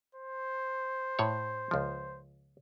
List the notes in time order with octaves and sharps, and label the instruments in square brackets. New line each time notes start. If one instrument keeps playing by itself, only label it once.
[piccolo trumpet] C5
[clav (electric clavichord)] A2 C#5
C#2 F3